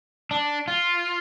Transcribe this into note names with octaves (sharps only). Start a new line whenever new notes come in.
D4
F4